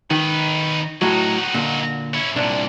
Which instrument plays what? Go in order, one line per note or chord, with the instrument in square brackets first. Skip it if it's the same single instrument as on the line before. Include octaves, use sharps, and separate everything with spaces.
[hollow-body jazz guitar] D#3 [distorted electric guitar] D#4 B4
[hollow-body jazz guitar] A2 F#3 [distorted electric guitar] D#4 F#4
[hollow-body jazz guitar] A#2 D3
[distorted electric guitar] C#4 E4
[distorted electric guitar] C2 A#2 [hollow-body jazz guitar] D4